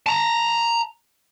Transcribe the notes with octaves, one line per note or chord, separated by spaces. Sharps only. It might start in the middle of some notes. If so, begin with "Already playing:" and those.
A5 A#5